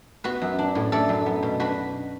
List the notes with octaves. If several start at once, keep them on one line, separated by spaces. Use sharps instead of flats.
B3 F#4 B4
F#2
D4
A2
A3 A4 D5
F#2
B3
B2
D4 F#4 B4